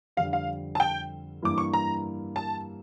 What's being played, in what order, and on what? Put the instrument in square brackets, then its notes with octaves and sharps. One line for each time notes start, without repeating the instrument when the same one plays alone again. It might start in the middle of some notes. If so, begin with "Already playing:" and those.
[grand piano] F2 D3 G3 [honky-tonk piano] F5
[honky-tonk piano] F5
A5
G5
[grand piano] G2 E3 A#3 E4 [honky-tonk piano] D6
[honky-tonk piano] C#6
A#5
A5